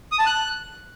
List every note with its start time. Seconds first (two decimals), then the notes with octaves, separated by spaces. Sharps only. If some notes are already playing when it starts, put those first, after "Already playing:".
0.12 D#6
0.19 A5
0.26 F#6